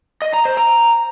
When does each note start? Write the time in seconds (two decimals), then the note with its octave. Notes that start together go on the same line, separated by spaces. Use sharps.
0.22 D#5
0.34 A#5
0.45 C5
0.57 A#5